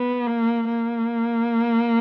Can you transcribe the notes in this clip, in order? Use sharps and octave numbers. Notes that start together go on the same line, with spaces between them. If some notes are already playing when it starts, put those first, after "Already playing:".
Already playing: B3
A#3
A#3